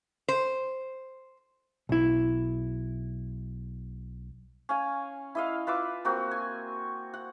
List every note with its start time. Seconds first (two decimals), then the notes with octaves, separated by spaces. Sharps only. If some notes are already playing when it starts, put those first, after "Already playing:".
0.28 C5
1.89 B1 E4
4.69 C#4 F5 G#5
5.35 E4 D#5 F5
5.67 F4 B4 E5 D6
6.05 A#3 C4 F#4
6.31 G#5
7.14 F#5